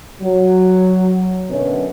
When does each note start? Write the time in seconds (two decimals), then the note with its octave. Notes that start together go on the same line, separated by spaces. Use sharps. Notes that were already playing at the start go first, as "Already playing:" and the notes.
0.22 F#3
1.50 F#2 B2 D3 B3 C#5